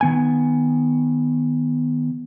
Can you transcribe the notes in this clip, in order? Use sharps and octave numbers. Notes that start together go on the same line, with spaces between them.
D#3 B3 G#5